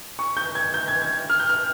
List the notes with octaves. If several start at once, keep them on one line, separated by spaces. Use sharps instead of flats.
C#6
G6
G#6
G6
G#6
G#6
F6
G6
F6